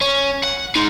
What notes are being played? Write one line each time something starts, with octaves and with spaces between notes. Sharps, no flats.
C#4
F#5
G#3 D#4